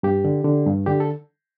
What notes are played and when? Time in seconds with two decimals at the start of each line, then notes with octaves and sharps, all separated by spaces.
0.03 G2 G4
0.25 D3
0.44 D3
0.66 G2
0.86 D3 G4
1.00 A4